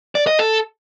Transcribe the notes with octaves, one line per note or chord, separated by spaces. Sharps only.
D5
D#5
A4